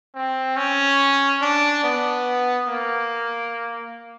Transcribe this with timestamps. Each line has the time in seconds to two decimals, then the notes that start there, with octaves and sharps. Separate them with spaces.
0.15 C4
0.57 C#4
1.42 D4
1.84 B3
2.68 A#3